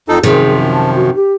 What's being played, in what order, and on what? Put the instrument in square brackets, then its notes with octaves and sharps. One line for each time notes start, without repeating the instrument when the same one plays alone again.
[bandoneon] F2 D#4 A4 [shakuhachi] F4
[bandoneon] F#2 F3 [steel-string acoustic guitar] C3 D#3 [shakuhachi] G#4
[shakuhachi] A5
F#4
G4